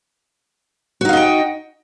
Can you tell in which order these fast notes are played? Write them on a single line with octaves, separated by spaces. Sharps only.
F#4 D#4 F5 D#5 G5